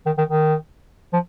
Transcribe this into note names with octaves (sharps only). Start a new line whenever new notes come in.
D#3
D#3
D#3
F3